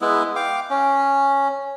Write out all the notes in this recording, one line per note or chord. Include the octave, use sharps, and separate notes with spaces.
G#3 B3 E4
F5 G5 D6
C#4